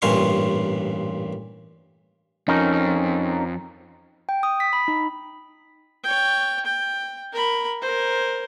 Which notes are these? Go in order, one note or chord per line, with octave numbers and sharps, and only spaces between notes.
A1 G2 A#2 F5 C6 C#6
F2 C#4 D#4 A#4
G5
D#6
B6
B5
D#4
C#5 G5
G5
A#4 B5
A#4 C5